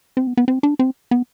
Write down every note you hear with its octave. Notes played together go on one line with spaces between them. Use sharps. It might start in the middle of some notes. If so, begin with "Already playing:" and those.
C4
B3
B3
C4
D4
C4
B3